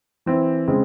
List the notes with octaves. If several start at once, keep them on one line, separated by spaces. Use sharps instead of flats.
E3 C4 E4
C#3 G#3 C4